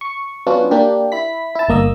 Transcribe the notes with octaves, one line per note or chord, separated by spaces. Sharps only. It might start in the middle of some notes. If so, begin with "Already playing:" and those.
C#6
F#3 B3 C#4 D4 F4 F#4
A#3 D4 G4
E4 B5 B6
E4 A5
G1 A#3 D#5 E6